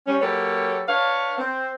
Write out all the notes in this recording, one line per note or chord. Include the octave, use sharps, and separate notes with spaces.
G3 C#4
F#3 A#3 G4 A4 B4 C#5
D4 B4 C#5 F5
C4